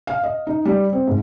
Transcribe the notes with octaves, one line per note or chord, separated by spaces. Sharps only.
F5
D#5
D#4
G3
C4
G#2